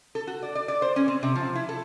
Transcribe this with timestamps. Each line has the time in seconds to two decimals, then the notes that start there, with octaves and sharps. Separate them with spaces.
0.15 A4
0.27 F#4
0.43 D5
0.55 D5
0.68 D5
0.82 C5
0.96 C#4
1.08 C4
1.23 C3
1.35 F3
1.55 E4
1.69 A4